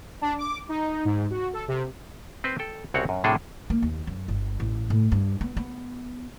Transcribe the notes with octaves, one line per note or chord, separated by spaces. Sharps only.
D4
D6
D#4
G#2
F#4
A4
C3
C4 B4 C5
A4 G5
C2 C#3 C4 F#4 C#5 F#5
F#2
A2 C3 F3 D4 G#4 A4
A#3
D#2
F#2
G1
A1
A2
G2
B3
B3